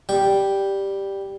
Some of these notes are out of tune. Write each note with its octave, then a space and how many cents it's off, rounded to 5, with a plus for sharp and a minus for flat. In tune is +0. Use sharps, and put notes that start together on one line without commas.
G3 +0 G5 +0